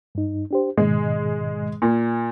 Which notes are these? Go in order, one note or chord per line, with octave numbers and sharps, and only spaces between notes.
G2 D#4
D4 G4 C5
G#2 B2 D#3 G#3
A#2